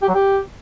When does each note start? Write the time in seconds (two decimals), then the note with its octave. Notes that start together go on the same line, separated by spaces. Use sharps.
0.02 G4
0.09 F#3
0.15 G4